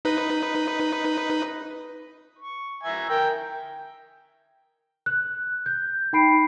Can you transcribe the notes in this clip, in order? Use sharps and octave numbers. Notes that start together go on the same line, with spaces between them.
D#4 B4
C#6
E5 G#5 A#5
A#4 G5
F#6
G6
D#4 G5 B5 C7 D7